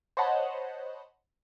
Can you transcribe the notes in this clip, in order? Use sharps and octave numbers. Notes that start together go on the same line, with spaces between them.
C5 C#5 D#5 F#5 A5 B5